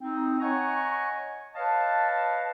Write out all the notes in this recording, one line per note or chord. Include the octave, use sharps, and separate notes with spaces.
C4 D#4
C#5 D#5 F#5 G#5 A#5 C#6
B4 C#5 D#5 F5 A5